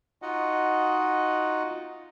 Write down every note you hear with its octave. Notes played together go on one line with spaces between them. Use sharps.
D#4 F4 F#4 D#5 F#5